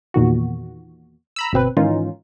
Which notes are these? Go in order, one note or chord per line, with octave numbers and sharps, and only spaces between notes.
E2 A#2 D#3 F#4
A#5 B5 E6
G1 B2 C4 B4
G#2 D#3 E3 C#4 D#4 F4